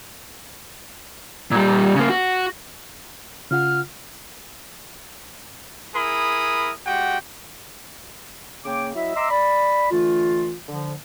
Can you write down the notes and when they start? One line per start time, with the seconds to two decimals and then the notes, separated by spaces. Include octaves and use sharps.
1.51 A#2 G3
1.96 C#3 A#3
2.10 F#4
3.51 C#3 F4 F#5 F6
5.94 E4 G#4 A#4 B5 D#6
6.86 G#3 F#4 G4 F#5 G5
8.65 C#3 A#3 C#5 G5 D6
8.95 F#3 E4 D#5 E5
9.16 D#5 E5 A#5 C6 D6 E6
9.31 D5 B5
9.91 D3 E3 A3 F4
10.68 D3 F3